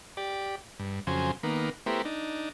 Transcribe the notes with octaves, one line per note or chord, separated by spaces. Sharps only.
G4 D5
G2
F2 C#3 F#3 C5 G#5
D#3 A#3 B3
A3 B3 E4 G4 A#4 C5
D4 D#4